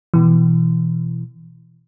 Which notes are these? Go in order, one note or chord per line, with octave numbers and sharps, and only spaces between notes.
B2 E3